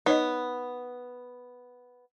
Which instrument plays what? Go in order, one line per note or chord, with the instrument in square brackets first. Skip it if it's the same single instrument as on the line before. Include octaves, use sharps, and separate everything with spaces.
[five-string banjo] B3 [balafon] D#4 C#5 D#5